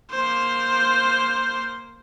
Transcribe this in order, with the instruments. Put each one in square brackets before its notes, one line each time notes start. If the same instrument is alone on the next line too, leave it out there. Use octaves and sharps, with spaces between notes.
[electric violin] A#3 C5